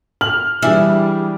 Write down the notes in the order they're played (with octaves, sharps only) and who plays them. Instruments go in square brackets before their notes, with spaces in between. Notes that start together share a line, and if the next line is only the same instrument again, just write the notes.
[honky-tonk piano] F6 [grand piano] F#7
[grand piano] E3 D4 G#4 [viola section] G3 [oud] E4